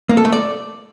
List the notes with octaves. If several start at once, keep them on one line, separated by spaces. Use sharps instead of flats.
A#3
A4
A3
D5